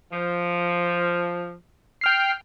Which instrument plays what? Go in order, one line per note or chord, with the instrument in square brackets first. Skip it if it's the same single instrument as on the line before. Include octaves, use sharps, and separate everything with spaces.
[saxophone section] F3
[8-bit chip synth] G5 F6 C7